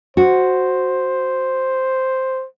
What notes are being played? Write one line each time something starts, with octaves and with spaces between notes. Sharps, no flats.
F#4 C5